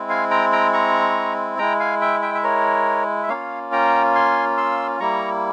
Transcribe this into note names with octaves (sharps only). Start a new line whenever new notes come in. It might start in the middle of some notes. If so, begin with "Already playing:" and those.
Already playing: G#3 C4 E4
F5 G#5
G5 A#5
G5 A#5
A#5 C#6
G#3 E4 G5 A#5
F5 G#5
E5 G5
E5 G5
E5
A#4 C#5
E5
A#3 C#4 F4 C#5 F5
G5 A#5
G#5 C6
C6 E6
G3 A#3 E4 A#5 C#6